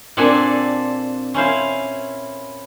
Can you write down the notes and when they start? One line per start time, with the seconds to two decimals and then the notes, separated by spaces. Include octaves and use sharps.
0.17 A#2 C4 D4 A4 G#5
1.34 C#4 E4 C5 F5